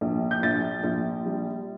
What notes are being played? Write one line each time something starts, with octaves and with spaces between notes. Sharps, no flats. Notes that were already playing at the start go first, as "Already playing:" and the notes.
A#1
G6
A#1 A6
A#1
G3